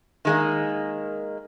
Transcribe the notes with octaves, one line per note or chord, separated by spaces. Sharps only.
D#3 G#3 A#3